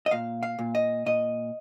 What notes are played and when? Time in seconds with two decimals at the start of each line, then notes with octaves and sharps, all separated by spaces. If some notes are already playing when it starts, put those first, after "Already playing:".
0.06 D#5
0.11 A#2 F5
0.43 F5
0.59 A#2
0.75 D#5
1.06 A#2 D#5